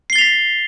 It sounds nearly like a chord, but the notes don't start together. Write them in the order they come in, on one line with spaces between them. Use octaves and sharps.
C7 G7 A6 F7 B6